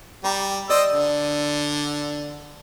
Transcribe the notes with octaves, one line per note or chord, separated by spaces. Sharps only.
G3 G4 A#5
C5 D5 D#5 E6
D3